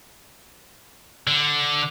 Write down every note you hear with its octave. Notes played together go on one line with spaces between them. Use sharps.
D3